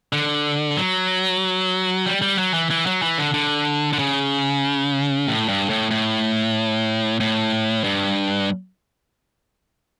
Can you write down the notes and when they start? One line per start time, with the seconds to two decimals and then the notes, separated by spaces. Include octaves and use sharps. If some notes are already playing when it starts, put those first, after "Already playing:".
0.13 D3
0.77 F#3
2.06 G3
2.22 G3
2.38 F#3
2.54 E3
2.71 E3
2.86 F#3
3.02 E3
3.18 D3
3.34 D3
3.93 D3
3.99 C#3
5.28 A2
5.48 G2
5.69 A2
5.91 A2
7.20 A2
7.84 G2